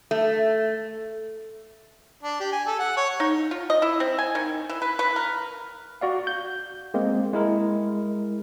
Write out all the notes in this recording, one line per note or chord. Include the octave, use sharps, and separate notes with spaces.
A3
D4
G4
G#5
A4
F#5
C#5
D#4
F4
D#5
E4
C4
G#5
D#3
E3
B4
B4
A#4
F#4 D5 F5
G6
G#3 A#3 C4
G#3 E4 A#4